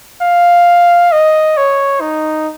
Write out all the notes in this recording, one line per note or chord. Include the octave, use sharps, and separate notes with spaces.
F5
D#5
C#5
D#4